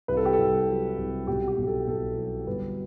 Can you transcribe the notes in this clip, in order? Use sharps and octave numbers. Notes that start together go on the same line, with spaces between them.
C2 B4
A4
G4
A4
C2
F#3
C2
B1 G4
G4
B1
A4
B1 A4
F#3
G1 B4